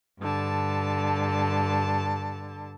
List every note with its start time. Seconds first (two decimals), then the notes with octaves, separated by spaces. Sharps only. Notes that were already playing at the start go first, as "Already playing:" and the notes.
0.19 G2 D3 A5